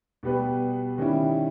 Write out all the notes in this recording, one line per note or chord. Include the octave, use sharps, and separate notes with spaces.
B2 G3 B3 G4 B4
D#3 G3 C#4 E4